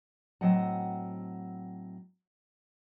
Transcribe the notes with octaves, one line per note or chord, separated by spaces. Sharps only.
A2 F#3 C4 D#5 F#5 A5